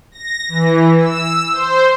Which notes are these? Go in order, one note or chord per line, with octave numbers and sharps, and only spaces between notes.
A#6
E3
E6
C5